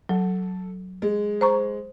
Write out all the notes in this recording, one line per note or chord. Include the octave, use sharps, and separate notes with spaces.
F#3 A4
G#3
C5 A#5 C#6